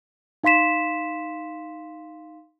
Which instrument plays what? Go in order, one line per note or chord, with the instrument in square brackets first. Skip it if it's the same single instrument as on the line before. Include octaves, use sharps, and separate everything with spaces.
[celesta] D#4 F5 C6 B6 E7